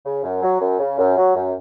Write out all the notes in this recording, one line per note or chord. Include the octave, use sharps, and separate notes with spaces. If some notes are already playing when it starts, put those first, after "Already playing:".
C#3
F#2
F#3
F#2
C#3
F#2
F#3
F#2